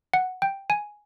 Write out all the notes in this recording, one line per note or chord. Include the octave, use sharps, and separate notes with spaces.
F#5
G5
G#5